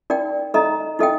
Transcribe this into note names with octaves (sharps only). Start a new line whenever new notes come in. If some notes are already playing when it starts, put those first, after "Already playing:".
D#4 A#4 D5 G5
D#4 A4 D#5 A#5
D#4 A4 D#5 G5